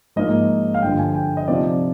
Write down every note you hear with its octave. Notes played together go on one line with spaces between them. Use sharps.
G#2 F3 A#3 D#4 D#5
F5
G2 D3 F3 G5
G#5
G5
D#5
C3 F3 C4 D#4 D5